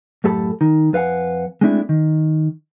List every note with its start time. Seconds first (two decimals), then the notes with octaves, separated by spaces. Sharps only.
0.24 F#2 A2 G4 A4 A5 B5
0.61 D#3
0.93 F2 B4 F5 F#5 G#5
1.61 G#3 A3 C4 D4 E4
1.89 D#3